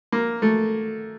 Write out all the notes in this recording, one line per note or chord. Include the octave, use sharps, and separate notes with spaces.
A#3
A3